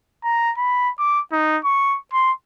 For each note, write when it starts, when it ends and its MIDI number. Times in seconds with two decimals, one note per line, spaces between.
0.24 0.52 82
0.58 0.90 83
0.99 1.20 86
1.32 1.58 63
1.65 1.99 85
2.13 2.32 84